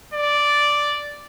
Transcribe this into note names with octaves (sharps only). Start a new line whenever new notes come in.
D5